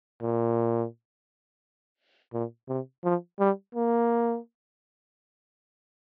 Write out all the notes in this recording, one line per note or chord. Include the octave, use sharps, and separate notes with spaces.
A#2
A#2
C3
F3
G3
A#3